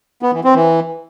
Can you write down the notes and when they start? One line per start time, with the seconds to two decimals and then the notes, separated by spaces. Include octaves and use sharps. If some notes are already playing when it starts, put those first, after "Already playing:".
0.22 B3
0.33 E3
0.44 C4
0.55 E3